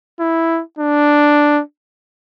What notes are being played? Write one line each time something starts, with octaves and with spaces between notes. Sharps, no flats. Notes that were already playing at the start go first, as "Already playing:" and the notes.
E4
D4